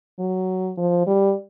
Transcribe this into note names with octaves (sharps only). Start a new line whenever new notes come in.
F#3
F3
G3